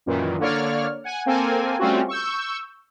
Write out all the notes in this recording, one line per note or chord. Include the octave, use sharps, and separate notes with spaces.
F#2 A#2 D#3 E3
D3 A#3 C#5 D5 F6
F#5 G#5
A#3 C4 A4 A#4 G#5
G3 A3 C4 C#4 F4 F#4
C#6 E6 G6